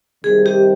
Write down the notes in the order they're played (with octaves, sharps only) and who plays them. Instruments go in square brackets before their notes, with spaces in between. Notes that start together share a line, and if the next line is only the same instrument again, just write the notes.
[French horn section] C3 D#3 G3 C4 D#4 [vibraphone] G#4
[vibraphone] G4